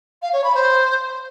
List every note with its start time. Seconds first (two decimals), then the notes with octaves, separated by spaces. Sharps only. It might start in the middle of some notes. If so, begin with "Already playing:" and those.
0.22 F5
0.33 C#5
0.44 B5
0.55 C5